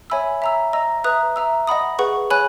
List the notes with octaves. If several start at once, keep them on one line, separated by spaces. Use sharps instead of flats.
C#5 E5 G#5 B5 E6
E5 A#5 E6
D#5 A#5 E6
B4 E5 A#5 D#6 F#6
E5 A#5 E6
D#5 F#5 B5 D#6
G#4 B4 F#5 C#6
C#5 G#5 B5 F#6